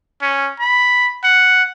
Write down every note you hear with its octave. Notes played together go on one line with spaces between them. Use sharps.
C#4
B5
F#5